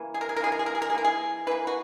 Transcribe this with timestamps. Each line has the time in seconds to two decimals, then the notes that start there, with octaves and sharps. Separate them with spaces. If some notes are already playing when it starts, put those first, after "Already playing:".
Already playing: C#3 E3 A#3
0.14 G#4
0.21 A#4
0.29 G#4
0.36 A#4
0.40 C#3 E3 A#3 G#4
0.52 A#4
0.59 G#4
0.66 A#4
0.75 G#4
0.82 A#4
0.90 G#4
0.94 E3 A#3 A#4
1.04 G#4
1.47 E3 A#3 B4
1.67 F#4